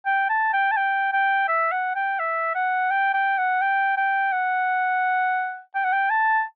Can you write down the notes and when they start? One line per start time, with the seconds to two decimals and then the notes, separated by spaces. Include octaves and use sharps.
0.06 G5
0.29 A5
0.53 G5
0.71 A5
0.77 G5
1.12 G5
1.48 E5
1.71 F#5
1.95 G5
2.19 E5
2.55 F#5
2.90 G5
3.14 G5
3.37 F#5
3.61 G5
3.97 G5
4.32 F#5
5.75 G5
5.84 F#5
5.92 G5
6.10 A5